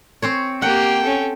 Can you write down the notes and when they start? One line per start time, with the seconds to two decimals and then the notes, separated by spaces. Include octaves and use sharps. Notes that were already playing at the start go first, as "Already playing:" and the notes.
0.22 C4 C5 C#5
0.62 A#3 G4 F#5 G5
1.02 C#4 A4